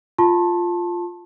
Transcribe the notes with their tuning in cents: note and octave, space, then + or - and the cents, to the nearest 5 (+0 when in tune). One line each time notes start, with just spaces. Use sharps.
F4 +0 A5 +0 C6 +45